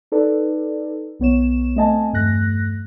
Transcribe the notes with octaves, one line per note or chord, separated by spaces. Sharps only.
D#4 A4 B4 D5
B1 B3 C#5 E7
A3 C4 D#5 G#5 A5
E2 G2 A3 F#6 A#6